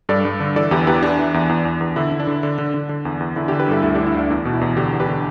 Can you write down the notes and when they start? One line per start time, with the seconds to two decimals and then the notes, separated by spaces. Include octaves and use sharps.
0.09 G2 A4 D5
0.25 G2
0.40 D3
0.56 E3 A4 D5
0.71 E2 G4 B4
0.87 E2 G4 B4
1.02 E3 D4 G4
1.18 E3
1.34 E2
1.49 E2
1.65 E2
1.81 E2
1.96 D3 E4
2.12 D3
2.20 D4
2.27 D3
2.43 D3
2.58 D3
2.74 D3
2.89 D3
3.05 E2
3.20 E2
3.36 D3 E4
3.48 D4 G4
3.52 D3
3.59 G4 B4
3.68 G2 E4 A4
3.83 D2 E4 A4
3.95 D3 D4 G4
4.06 E4
4.14 D2 D4
4.30 E2 D4
4.45 B2
4.53 E4
4.61 E2
4.77 D3 D4 G4
4.93 E2
5.00 G4 B4
5.08 D3